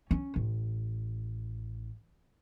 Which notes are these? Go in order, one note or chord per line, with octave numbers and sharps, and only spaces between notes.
C#4
A1